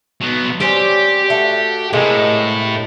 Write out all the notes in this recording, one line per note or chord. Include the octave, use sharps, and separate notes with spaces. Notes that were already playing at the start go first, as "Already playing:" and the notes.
F#3 B3
G3 C4 C#4 G4
A3 F#4
A2 C3 G#3 A#3